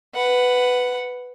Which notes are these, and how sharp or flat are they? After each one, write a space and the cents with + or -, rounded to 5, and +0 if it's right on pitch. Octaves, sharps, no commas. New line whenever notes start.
B4 +10 F#5 +0